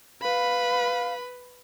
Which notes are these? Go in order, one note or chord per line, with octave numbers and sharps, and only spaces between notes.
B4 F5 B5